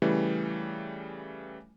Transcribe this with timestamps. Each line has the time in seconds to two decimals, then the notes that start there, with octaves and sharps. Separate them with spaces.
0.02 C#3 E3 G3 A3